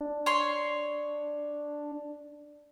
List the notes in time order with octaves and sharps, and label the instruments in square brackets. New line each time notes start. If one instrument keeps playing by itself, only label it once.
[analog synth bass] D4
[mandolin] C#5 C6